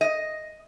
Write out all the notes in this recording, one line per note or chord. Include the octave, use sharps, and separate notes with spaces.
D#5